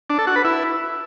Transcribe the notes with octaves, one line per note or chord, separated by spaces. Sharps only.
D4
A4
F#4
B4
E4